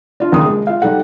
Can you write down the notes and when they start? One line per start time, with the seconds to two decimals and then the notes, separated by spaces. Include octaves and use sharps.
0.20 D4 F4
0.32 D#2 C#3 D#6
0.46 G#3
0.67 F4 F5
0.82 G3 D#4 A4 F#5